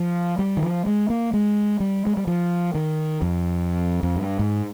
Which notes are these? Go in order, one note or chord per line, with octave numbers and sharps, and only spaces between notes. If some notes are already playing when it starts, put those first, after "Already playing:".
Already playing: F3
G3
D#3
F3
G#3
A#3
G#3
G3
G#3
G3
F3
D#3
F2
F2
G2
G#2